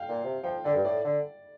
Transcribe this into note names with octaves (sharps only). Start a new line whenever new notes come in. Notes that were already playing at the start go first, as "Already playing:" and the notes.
Already playing: F5 G5
A#2
C3
F3 G5
D3 D5
G2
A2 D5
D3